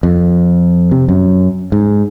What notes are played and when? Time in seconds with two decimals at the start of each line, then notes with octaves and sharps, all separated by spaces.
0.03 F2
0.91 C3
1.09 F#2
1.72 G#2